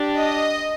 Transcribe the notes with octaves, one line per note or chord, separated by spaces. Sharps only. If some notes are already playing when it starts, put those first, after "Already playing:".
Already playing: D4 G4
D#5